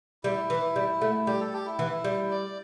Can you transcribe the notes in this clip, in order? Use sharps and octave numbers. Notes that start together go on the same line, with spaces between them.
G3 E4
E3
G3
A3
G3 G4
A4
G4
E4
E3
G3
D5